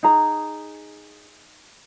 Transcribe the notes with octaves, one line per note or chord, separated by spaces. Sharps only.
D#4 G#4 A#5